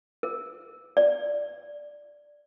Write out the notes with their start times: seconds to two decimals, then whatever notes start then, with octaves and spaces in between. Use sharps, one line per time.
0.23 A#4
0.97 D5